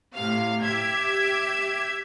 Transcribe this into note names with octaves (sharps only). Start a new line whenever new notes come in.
A2 C3 F5
G4 E5 G#6